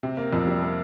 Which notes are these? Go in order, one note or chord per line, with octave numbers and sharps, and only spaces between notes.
C3
A#3
F2
G3
A#3